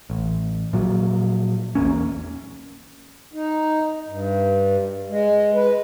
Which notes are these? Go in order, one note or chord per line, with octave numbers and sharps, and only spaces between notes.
A1
A#2 F3 F#3
A#1 E2 A#3 C#4
D#4
G2
G#3
B4